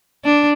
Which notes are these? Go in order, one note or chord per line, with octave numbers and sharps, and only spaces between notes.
D4